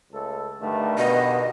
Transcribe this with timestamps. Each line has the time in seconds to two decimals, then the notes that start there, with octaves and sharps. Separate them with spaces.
0.12 C#2 A3 A4
0.61 G2 D3 D#3 A3
0.98 B2 B3 D#5